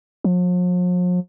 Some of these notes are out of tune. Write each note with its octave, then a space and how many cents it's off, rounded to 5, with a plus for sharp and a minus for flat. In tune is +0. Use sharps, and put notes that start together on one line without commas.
F3 +45